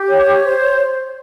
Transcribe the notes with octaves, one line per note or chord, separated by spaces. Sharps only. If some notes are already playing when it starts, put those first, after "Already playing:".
Already playing: G4
C#5
C5